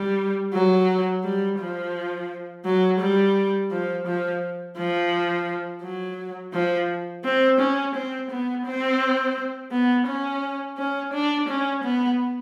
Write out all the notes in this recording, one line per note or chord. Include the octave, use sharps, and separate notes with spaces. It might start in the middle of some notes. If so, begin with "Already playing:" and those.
Already playing: G3
F#3
G3
F3
F#3
G3
F3
F3
F3
F#3
F3
C4
C#4
C4
B3
C4
B3
C#4
C#4
D4
C#4
B3